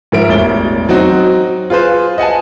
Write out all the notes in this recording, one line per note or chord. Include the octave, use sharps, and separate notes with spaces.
G#2 F3 A#4 E5 D7
E1 A1 A6 G7
F#3 C4 D#4 F#4
F4 G#4 B4 C5
D#5 F#5 G#5 A5